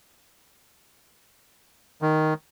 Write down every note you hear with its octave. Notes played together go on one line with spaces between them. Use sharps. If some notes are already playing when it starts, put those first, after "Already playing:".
D#3